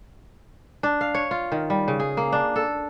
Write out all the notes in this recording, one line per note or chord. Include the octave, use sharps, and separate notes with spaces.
D4
F5
C#5
F4
D#3
G3
C#3
G#4
A#3
D4
A4